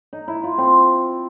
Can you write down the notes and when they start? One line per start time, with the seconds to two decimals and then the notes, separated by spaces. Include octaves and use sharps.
0.13 D#4
0.28 E4
0.44 F4
0.58 C4